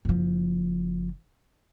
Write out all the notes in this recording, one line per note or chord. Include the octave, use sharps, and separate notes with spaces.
F#1 F3